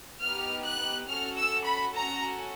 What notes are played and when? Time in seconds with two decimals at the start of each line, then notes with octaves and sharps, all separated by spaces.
0.22 B3 D#4 G4 F6
0.65 F#6
1.08 C#4 F#4 A4 F6
1.36 E6
1.64 B5
1.93 C#4 F#4 A4 A#5